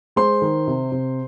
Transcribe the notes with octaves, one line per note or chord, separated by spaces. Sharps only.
G#3 C5 C6
D#3
C3
C3